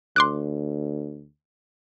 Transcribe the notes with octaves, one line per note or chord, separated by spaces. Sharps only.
D2 C6 D6 F#6